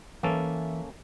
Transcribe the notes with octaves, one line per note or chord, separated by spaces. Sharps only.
E3 A#3 C#4 A4 E5